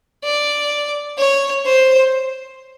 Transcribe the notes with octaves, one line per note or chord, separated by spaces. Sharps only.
D5
C#5
C5